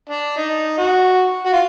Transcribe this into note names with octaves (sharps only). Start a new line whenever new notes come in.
D4
D#4
F#4
F#4
F4